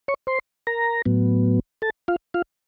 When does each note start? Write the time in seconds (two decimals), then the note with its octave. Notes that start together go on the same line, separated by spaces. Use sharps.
0.08 C#5 C#6
0.27 C5 C6
0.67 A#4 A#5
1.06 A2 F#3 B3
1.82 A4 A5
2.08 F4 F5
2.34 F4 F5